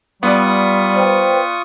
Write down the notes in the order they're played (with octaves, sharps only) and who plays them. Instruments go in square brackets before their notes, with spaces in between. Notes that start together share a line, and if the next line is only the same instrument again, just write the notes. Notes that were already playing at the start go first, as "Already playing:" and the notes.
[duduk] G3 [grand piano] B3 D5 [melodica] F4 C#6 D#6
[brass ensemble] B4 C5 G5